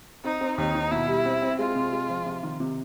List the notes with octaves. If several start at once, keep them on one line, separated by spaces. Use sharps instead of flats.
C4 D#4
C4
D#2 D#4
D#3
B2 E4
G3
C4
C4
G#3 F4
C3
G#3
F3
C3
D#3
C3